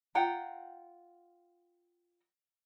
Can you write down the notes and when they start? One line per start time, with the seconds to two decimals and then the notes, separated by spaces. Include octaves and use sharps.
0.15 F4 F#5 G5 A#5